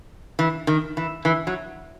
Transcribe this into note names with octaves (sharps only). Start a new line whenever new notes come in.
E3
D#3
E3
E3
F#3